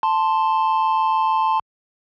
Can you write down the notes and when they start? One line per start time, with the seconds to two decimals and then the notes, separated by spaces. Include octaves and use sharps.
0.03 A5 C6